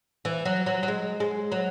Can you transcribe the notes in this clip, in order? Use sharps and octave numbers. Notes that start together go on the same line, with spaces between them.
E3
F#3
F#3
F#3
G#3
G#3
F#3